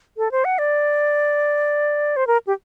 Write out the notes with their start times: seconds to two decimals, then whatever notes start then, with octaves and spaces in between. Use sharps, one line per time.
0.17 A4
0.32 C5
0.45 F#5
0.58 D5
2.16 C5
2.27 A#4
2.47 G4